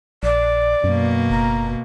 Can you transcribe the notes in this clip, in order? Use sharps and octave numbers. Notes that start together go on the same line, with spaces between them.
A#1 D5
F#2 B2 A#3
F#1 A#5